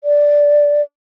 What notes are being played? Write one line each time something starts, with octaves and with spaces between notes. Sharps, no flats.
D5